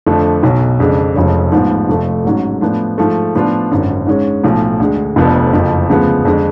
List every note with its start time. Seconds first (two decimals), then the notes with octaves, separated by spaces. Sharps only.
0.06 F2 D3 F3 A3 D4
0.43 B1 B2 F#3
0.80 F2 C#3 G#3 D4
1.16 F1 F2 F3 G#3 C#4
1.52 A1 G#2 F3 B3
1.89 F1 F2 F3 A3
2.25 A1 G#2 F#3 C#4
2.61 A2 F3 B3 D4
2.98 G#2 F3 A3
3.35 A2 F3 B3 D4 F4
3.71 G#1 F#2 D3
4.07 G#2 G#3 C#4
4.44 B1 A2 F3
4.80 D2 D3 G#3
5.16 F1 F2 F3 B3 D4
5.53 F#1 F2 F3
5.90 D2 C#3 F3 G#3 B3
6.25 F2 D3 G#3